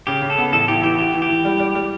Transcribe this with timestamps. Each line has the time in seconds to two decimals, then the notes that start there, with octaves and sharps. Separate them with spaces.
0.07 C#3 G4
0.22 C#3
0.30 A4
0.38 B3
0.52 A1 A4
0.68 E3 G4
0.83 E3 G4
0.98 F#4 G4
1.14 E3
1.22 G4
1.29 E3
1.45 G3
1.59 G3
1.75 G3